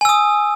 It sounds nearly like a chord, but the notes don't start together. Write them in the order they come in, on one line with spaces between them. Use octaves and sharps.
G#5 E6 D#6